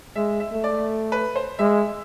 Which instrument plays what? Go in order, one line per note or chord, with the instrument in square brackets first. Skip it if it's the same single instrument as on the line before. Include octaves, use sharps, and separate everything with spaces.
[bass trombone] G#3 [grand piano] E5
[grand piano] E5
[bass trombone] A3
[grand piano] D5
B4
C5
[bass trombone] G#3 [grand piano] E5